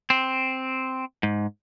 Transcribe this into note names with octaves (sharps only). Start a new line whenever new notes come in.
C4
G#2